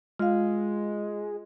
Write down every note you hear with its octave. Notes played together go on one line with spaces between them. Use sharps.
G#3 F4 F5